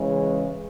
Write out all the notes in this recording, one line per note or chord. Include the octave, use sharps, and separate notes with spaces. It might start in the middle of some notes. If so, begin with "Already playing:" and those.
Already playing: C#3 E3 G#3